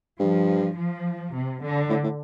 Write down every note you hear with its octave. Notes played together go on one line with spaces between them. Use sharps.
G2 F3
F3
C3
D3
A2
A2